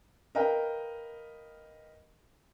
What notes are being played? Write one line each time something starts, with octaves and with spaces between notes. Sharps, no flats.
A#4 B4 D#5 F5 G5